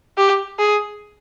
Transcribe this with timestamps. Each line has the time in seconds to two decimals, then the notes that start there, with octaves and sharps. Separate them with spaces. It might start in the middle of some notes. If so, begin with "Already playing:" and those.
0.17 G4
0.59 G#4